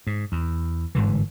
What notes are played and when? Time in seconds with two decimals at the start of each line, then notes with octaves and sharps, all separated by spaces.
0.07 G#2
0.32 E2
0.95 G1 G#2 D3 E3